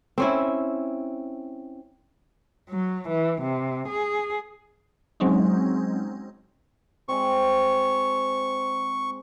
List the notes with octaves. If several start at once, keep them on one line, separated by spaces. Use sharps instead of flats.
C4 C#4 E4
F#3
E3
C3
G#4
F#3 G#3 C4 C#4 D#4
G#3 C4 C#6